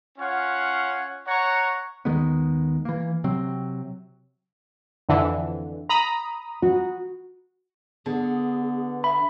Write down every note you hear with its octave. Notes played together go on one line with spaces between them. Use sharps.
C#4 F4 C#5 F#5
C#5 F#5 A#5 C#6
D#2 D#3 G#3 B3
E3 A#3
C3 F#3 C4
F2 D3 E3
A#5 B5 D#6
F#4
D3 B3 G#4
E5 B5